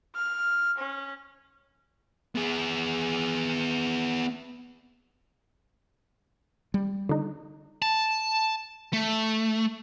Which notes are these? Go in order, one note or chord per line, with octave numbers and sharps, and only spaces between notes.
F6
C#4
B3 G#4
G3
D3 D#4
A5
A3